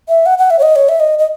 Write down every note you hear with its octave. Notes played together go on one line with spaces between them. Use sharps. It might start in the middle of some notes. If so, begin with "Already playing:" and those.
E5
F#5
F#5
E5
C#5
D#5
C#5
E5
D#5
D#5